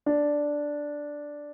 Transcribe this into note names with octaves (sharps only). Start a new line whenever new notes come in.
D4